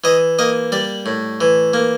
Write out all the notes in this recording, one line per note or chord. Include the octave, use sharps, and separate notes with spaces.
E3 D#5
A#3 D#5
G3 D5
A2
E3
A#3